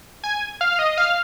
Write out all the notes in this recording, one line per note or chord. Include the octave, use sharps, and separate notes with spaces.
G#5
F5
D#5
F5